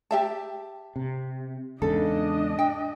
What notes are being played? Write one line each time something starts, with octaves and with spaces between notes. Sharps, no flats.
G4 E5 A5
C3
E2 G#2 C#3 D4 A4 D#5
G5